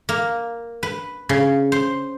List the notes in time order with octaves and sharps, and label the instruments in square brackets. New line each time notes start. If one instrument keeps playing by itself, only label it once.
[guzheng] A#3
B4
C#3
C5